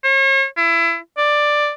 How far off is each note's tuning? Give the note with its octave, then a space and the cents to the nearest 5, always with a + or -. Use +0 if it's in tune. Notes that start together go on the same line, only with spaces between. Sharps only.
C#5 -40
E4 +25
D5 +10